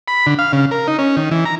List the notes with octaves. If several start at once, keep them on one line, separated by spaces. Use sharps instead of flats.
B5
D3
F5
C#3
A#4
D#4
C#4
D#3
E3
A#5